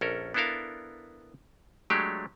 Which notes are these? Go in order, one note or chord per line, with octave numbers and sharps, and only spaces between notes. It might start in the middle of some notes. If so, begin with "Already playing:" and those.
A#1 C#4 A4 A#4
B3 D4 E4 A4 A#4 F5
F#3 G#3 A3 D4 G4 C#5